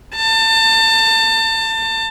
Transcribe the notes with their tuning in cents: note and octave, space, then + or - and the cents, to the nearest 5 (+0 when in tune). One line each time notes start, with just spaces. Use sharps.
A5 +30